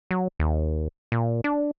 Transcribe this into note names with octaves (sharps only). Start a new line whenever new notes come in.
F#3
D#2
A#2
D4